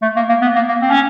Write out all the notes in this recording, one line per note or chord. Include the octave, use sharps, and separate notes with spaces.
A3
A#3
A#3
B3
A#3
A#3
C4
C#4